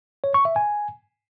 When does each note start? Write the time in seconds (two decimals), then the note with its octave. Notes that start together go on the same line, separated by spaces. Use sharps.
0.24 C#5
0.34 C#6
0.45 E5
0.56 G#5